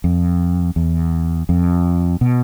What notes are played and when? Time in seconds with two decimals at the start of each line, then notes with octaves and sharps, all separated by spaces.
0.04 F2
0.76 E2
1.49 F2
2.21 B2